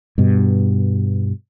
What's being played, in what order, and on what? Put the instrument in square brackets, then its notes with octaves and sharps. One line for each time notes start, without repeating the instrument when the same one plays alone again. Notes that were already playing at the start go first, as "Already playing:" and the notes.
[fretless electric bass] G2 B2